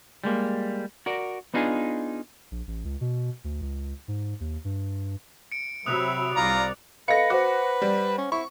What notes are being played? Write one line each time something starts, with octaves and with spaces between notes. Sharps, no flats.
G3 G#3 A#3
F#4 A#4 D5
B3 D4 D#4 F4 G#4
A#1
A1
C#2
B2
D2
C#2
G#2
D#2
G2
C#7 D7
C3 F#3 E5 B5 D#6 F#6 F7
C2 F4 D5 A#5
A4 B4 D#5 F5 A#6 C#7
F#4 C5 F#5 D6
G3
C#4
E4 C#6